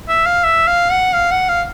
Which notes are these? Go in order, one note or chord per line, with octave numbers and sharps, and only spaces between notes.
E5
F5
E5
F5
F#5
F5
F#5
F5